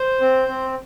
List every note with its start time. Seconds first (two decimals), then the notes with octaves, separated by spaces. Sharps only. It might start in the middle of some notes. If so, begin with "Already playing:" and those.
Already playing: C5
0.21 C4
0.48 C4